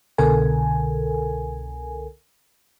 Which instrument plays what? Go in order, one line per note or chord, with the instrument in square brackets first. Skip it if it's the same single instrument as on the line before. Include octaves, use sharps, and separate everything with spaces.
[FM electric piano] C2 B2 D3 A4 A#4 G#5